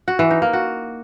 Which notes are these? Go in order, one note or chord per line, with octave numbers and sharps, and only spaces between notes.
F#4
E3
D#4
A#3
F#4